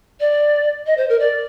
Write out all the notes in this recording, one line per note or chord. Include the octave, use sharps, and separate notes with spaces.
D5
D#5
C5
A#4
D5